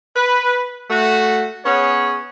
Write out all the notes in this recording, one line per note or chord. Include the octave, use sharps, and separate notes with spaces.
B4
A3 F#4
B3 C#4 G#4 C#5